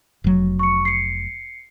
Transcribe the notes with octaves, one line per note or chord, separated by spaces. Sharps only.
F1 F#3
C#6 C#7
C7 C#7